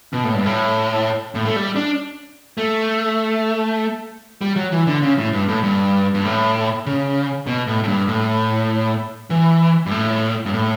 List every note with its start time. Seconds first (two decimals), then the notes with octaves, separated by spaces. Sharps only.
0.13 B2
0.24 A2
0.35 G2
0.46 A2
1.35 A2
1.45 A3
1.56 G3
1.76 D4
2.58 A3
4.41 G3
4.56 F#3
4.72 E3
4.87 D3
5.02 C#3
5.18 A2
5.33 G2
5.48 A2
5.63 G2
6.14 G2
6.25 A2
6.86 C#3
7.47 B2
7.67 A2
7.83 A2
7.88 G2
8.07 A2
9.30 E3
9.86 G2
9.91 A2
10.46 G2
10.53 A2